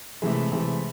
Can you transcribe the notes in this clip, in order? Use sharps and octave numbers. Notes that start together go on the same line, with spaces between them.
C3 E3 G#3 A3
C3 E3 G#3